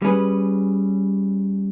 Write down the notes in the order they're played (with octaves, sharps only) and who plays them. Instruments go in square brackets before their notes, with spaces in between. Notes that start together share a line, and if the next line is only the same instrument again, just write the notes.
[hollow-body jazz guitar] G3 C#4 G#4 B4